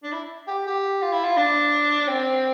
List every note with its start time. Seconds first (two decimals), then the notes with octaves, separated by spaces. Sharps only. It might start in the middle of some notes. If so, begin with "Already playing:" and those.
0.03 D4
0.12 E4
0.48 G4
0.67 G4
1.02 F4
1.13 E4
1.24 F4
1.37 D4
2.08 C4